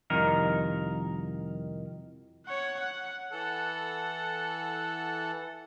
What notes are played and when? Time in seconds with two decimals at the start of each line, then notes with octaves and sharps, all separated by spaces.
0.10 C2 F2 D#3 A#4
2.46 C#5 F#5
2.80 F#5
3.30 E3 A4 F#5